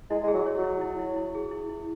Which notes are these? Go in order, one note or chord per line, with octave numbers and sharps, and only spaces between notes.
G#3 E4
G#3 G#4
F#3
C#5
F#3
E4
E4
E4
E4
G#4
E4
E4